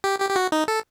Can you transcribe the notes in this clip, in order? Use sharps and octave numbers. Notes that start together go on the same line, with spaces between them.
G4
G4
G4
F#4
D#4
A4